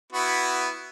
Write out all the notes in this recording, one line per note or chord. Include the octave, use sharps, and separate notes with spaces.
B3 E4 F#4